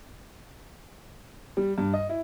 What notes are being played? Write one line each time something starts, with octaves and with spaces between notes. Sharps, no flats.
G3
G2
D#5
E4